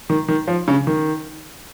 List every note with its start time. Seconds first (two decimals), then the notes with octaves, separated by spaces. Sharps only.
0.10 D#3
0.28 D#3
0.47 F3
0.68 C#3
0.87 D#3